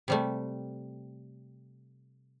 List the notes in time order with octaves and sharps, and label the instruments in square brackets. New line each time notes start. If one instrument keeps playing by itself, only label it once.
[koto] C3 G3 A3